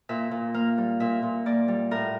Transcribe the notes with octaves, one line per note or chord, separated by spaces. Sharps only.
A#2 E5
A#2
A#3 F5
G3
A#2 E5
A#2
A#3 D5
G3
A2 A#4